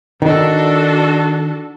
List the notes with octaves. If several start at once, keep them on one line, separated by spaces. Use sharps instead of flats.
D#3 D4 F#4 A4